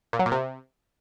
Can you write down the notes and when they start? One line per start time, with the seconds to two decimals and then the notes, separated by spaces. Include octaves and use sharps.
0.13 A#2
0.19 F#3
0.26 A#2
0.32 C3